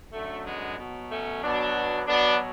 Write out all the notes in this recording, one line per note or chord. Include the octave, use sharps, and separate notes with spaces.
F#2 D3 F#3 A3
G#3 B3
B2 F#3
A3 C#4
B2 F#3 B3 D4
B2 F#3 B3 D4